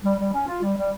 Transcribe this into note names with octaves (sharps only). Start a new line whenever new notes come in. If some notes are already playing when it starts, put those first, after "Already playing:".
G3
G3
C#4
F4
G3
G3